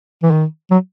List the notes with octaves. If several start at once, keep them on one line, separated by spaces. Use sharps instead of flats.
E3
D#3
F#3